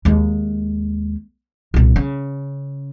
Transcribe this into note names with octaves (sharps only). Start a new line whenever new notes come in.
D#2 G#3
C2 A#2
C#3